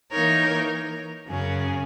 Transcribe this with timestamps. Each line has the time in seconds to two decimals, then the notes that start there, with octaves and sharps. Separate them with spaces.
0.11 E3 A#3 D#4 A#4 C#5
1.28 F#2 C#3 F#3 C#4 G#4